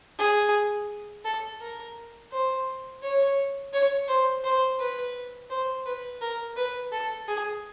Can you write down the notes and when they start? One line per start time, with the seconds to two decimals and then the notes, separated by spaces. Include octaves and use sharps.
0.19 G#4
1.24 A4
1.61 A#4
2.32 C5
3.03 C#5
3.73 C#5
4.08 C5
4.44 C5
4.80 B4
5.50 C5
5.86 B4
6.21 A#4
6.57 B4
6.92 A4
7.28 G#4